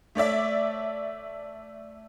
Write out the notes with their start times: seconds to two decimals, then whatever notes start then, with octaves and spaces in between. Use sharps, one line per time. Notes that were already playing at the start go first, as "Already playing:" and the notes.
0.15 A3 C#5 D5 E5